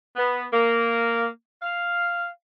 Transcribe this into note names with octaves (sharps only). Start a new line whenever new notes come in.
B3
A#3
F5